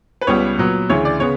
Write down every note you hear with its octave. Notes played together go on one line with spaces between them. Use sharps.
B4
C#2 C#3 G3 B3 C#5
A#2 F#3 B3
D2 C#3 E3 C#5
D5
C#3 B3 C#5